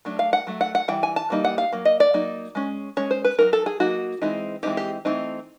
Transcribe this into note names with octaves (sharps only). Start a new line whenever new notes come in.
F#3 A3 D4
F5
F#5
F#3 A3
F#5
F#5
E3 G3 G5
G#5
A5
E3 G3 A#3 D#4
F#5
F5
F#3 A#3
D#5
D5
F#3 A#3 D#4
G#3 C#4
G#3 C#4 C#5
C5
B4
F#3 A#3 D#4 A#4
A4
G#4
F#3 A#3 D#4 F#4
E3 G#3 C4 D#4
E3 G#3 C4 D#4 G4
G4
E3 A3 C4 D#4